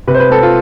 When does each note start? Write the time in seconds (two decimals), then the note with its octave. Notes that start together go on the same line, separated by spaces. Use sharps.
0.08 C3 B4
0.15 C5
0.20 B4
0.31 C4 A4
0.43 F4